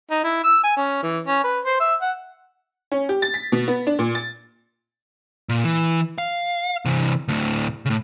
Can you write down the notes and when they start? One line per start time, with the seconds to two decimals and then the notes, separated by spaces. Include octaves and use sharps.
0.11 D#4
0.24 E4
0.44 E6
0.63 G#5
0.77 C#4
1.02 E3
1.27 C#4
1.44 B4
1.65 C5
1.80 E5
2.01 F#5
2.92 C#4
3.09 G4
3.22 A6
3.34 B6
3.52 B2
3.68 B3
3.87 D4
3.99 A#2
4.15 A6
5.49 A#2
5.64 E3
6.18 F5
6.85 C3 E3
7.28 D2 A2
7.86 A2 C#3